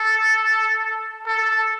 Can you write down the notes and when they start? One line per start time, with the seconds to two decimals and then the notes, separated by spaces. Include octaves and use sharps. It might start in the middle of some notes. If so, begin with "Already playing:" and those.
Already playing: A4
1.26 A4